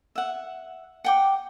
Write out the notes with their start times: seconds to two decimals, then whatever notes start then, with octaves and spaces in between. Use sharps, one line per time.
0.15 E5 F#5
1.04 F#5 G5 D6